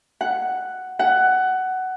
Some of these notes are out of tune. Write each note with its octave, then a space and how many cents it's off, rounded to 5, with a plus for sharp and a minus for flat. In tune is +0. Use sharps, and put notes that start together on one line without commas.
F#5 +5
F#5 +15